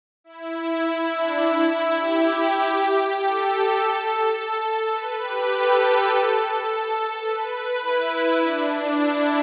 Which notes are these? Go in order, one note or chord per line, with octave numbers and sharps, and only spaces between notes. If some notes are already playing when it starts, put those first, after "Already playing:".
E4
E4
D4
E4
G4
A4
B4
G4
A4
B4
E4
D4
E4